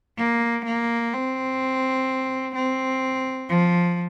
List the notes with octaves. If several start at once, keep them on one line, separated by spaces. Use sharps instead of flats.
A#3
A#3
C4
C4
F3